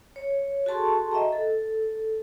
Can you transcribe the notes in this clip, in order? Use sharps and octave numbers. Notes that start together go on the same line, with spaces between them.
C#5
F#4 G#4 A4 A5 C6 C#6
D#5 E5 G5 A#5
A4